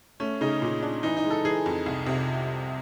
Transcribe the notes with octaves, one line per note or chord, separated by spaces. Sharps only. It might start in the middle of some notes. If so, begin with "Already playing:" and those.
A3 C#4
C#3 D#4
A#2
D4
E3 D#4
D#4
G#3
A4
E3 G#4
F2
C2
C3